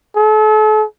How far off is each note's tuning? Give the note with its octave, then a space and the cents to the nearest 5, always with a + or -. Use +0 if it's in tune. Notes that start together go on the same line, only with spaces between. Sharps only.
A4 -40